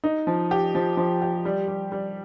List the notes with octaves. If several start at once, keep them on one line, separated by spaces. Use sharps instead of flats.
D#4
F3
G4
F3
F3
G4
G3
G3
G3